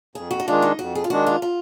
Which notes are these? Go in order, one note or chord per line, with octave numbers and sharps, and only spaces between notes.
F2 G#4
F#4
D#4
D#3 G#3 D4 F4
D#4
F2 F#4
G#4
F4
D#3 G#3 D4 F#4
F4
F4